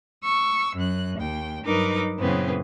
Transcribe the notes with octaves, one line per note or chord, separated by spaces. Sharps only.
C#6 E6
F#2 F#6
D#2 G5
G2 F#3 D#4 A#4 B4 D6
F#2 A#2 C#3 E3 B3 C4